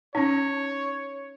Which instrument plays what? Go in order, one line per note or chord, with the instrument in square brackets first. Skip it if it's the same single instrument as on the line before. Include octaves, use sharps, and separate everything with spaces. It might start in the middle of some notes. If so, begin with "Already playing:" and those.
[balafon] C#4 D#4 [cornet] C#5